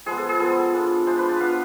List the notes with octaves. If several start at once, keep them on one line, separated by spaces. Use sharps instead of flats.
F3 G#3 B3 G#4
A4
G#4
F3 G#3 B3 A4
G#3 D4 F4
G#3 D4 F4 C5
B4
A5
B3 D4 F4 F5